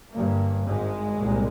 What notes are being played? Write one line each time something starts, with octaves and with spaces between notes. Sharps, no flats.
G1 G2 A#3
G#1 G#2 G#3
C2 A#2